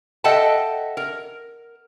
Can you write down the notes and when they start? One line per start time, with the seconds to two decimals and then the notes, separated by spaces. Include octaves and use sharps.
0.24 A4 D#5 E5 F#5 G5 A5
0.97 A#4